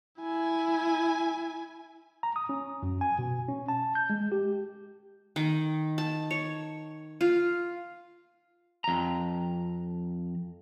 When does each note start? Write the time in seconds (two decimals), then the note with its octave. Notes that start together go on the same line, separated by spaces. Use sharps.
0.20 E4 G#5
2.23 A#5
2.36 D#6
2.49 C#4
2.83 F#2
3.01 G#5
3.18 B2
3.48 C#4
3.68 A5
3.95 G6
4.10 G#3
4.32 G4
5.36 D#3
5.98 A5
6.31 C#5
7.21 F4
8.84 F2 A#5